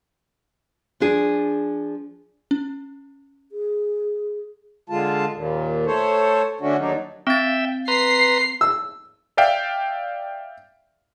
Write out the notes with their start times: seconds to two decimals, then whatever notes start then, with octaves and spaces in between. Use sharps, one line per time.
1.00 F3 D4 G#4
2.51 C#4
3.52 G#4
4.89 D3 G#3 F4 A5
5.33 D#2 A#2
5.87 A3 A4 C5 C#5
6.61 D3 A3 C#4 D4 F#4
6.78 D#2 F#3 D4 D#4
7.27 C4 E5 G5 A6
7.88 B4 A#5 C6 C7
8.61 E6
9.37 D5 E5 F5 G5